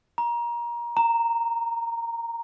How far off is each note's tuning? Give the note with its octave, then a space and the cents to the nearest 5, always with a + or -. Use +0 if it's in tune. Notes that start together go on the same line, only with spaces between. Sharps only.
A#5 +25
A#5 -10